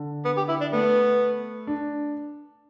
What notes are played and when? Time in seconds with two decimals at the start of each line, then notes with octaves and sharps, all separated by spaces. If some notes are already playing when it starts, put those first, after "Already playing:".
Already playing: D3
0.25 B3
0.37 G4
0.49 E4
0.61 D4
0.72 A3 B3
1.67 D4